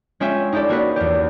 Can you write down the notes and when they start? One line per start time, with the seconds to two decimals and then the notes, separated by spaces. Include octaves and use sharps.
0.20 G#3 C#4 F4 C#5 E5 G5
0.53 D#4 E4 G4 A4 D5
0.69 A#3 F#4 A#4 B4
0.96 E2 G4